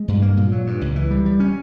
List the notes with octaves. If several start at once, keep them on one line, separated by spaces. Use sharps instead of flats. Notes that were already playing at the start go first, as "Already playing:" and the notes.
Already playing: G#3
G2
A#3
A#2
F#3
G2
C#2
E3
G3
G3
C#4